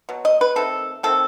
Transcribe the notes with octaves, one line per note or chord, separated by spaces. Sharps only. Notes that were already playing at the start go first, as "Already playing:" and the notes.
B2 F#3
D#5
B4
D#3 A3 C4 A4
D#3 A3 C4 A4